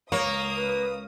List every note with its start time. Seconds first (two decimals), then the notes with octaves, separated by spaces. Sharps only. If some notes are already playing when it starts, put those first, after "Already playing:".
0.12 C#2 A#3 C#5 D#6
0.57 B4